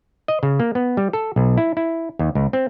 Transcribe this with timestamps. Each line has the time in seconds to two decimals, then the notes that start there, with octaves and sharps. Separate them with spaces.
0.28 D#5
0.43 C#3
0.60 A#3
0.75 B3
0.97 G3
1.13 A4
1.36 B1
1.57 E4
1.77 E4
2.19 D#2
2.35 C#2
2.53 C4